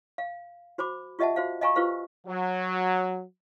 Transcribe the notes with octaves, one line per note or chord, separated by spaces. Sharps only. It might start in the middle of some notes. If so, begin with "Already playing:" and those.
F5
F#4 C5 B5 D6
F4 G4 D#5 E5 F#5 A5
F#4 C5 F5
D#5 F5 G#5 A#5 C#6
F4 G4 B4 C5 F5
F#3